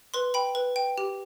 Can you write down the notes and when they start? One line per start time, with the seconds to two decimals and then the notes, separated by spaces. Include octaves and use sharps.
0.14 B4 C6
0.34 G5 B5
0.55 B4
0.76 G5
0.98 G4